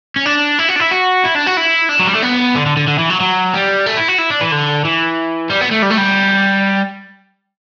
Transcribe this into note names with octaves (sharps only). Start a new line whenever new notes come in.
C#4
D4
E4
F#4
D4
E4
F#4
E4
D4
F#4
E4
D4
F#3
G3
A3
B3
D3
D3
D3
D3
E3
F#3
F#3
G3
A3
E4
F#4
E4
D4
E3
D3
E3
G3
B3
A3
G3
A3
G3